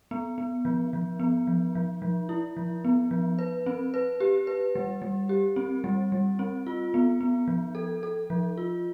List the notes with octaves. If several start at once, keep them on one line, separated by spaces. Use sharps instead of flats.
B3
B3
F3
F3
B3
F3
F3
F3
E4
F3
B3
F3
B4
C4
B4
G4
B4
G3
G3
G4
C4
G3
G3
C4
F4
B3
B3
F3
A4
A4
F3
F4